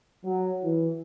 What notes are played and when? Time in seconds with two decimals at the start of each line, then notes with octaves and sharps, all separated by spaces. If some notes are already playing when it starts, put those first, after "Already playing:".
0.24 F#3
0.63 E3